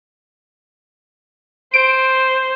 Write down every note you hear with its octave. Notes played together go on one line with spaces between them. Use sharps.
C5 D7